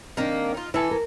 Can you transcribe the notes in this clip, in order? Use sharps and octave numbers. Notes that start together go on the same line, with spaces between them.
D#3 A#3 C4 D4
D#4 F4
E3 E4 A4 G#5
A#4